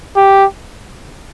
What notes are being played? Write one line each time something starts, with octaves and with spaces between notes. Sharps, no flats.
G4